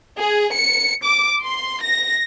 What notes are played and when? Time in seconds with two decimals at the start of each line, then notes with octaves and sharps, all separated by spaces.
0.19 G#4
0.54 C#7
1.05 D6
1.43 C6
1.84 A#6